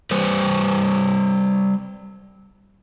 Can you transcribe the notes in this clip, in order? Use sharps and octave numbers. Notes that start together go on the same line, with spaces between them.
G3 B4 C5